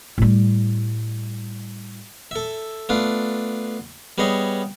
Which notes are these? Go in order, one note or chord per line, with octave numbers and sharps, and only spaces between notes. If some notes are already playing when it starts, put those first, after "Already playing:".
A2 G3
A4 E5
A3 B3 D4 F4
G3 B3 G#4 C#5 D#5